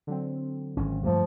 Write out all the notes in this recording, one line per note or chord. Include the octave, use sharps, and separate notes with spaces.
D3 F#3 C4
G#1 C#4
G2 F3 A3 A#3